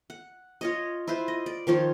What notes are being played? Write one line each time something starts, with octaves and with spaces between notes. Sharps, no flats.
F#5
F4 C#5 D#5
E4 F4 B4 C5
D#5
D5
D#3 F3 F4 C#5